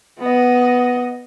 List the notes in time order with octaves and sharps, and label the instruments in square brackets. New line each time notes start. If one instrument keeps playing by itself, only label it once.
[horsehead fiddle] B3 D#5